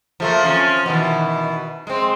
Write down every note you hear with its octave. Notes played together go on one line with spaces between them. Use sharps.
F3 A3 A#3
C3 F3 C#4
B2 D#3 E3
G#3 C4